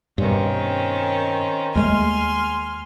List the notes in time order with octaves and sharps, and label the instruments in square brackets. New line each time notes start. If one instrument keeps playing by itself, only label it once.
[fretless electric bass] G2 B2 [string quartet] D#3 C4 C#4
[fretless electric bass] D#2 G#3 A3 [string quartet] G#5 C6 F6